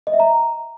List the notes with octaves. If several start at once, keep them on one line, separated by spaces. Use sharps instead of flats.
D#5
E5
A#5